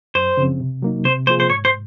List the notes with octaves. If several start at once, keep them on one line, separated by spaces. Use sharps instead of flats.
F#2 C5
C#3 F3 C4
C3
F#3 A#3 D#4
C3 C5
F3 A#3 F4 G#4 C5
C5
G#2 C#5
C5